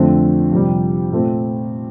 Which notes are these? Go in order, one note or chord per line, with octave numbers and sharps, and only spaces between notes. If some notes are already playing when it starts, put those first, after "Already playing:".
Already playing: F2 D3 A3 C4
F2 C3 G3
A#2 A3 C4